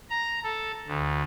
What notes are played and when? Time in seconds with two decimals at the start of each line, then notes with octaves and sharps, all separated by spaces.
0.10 A#5
0.43 A4
0.88 D2